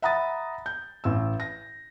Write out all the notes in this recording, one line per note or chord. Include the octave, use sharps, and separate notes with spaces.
E5 F#5 A#5 B5 D#6 A6
G6
A1 E6
A#6